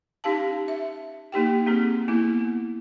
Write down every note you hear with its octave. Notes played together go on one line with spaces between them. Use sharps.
C#4 D#4 G4 F5 A5
E5
A#3 D#4 G4 G5
A#3 C4 G#4
A#3 B3 E4